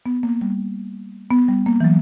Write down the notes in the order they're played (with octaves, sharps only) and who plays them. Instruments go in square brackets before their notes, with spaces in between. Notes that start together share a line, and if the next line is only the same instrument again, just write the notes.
[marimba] B3
A#3
G3
B3
G3
A#3
E3
F#3